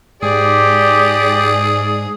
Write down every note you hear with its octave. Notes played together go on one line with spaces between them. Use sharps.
G#2 G4 G#4 D5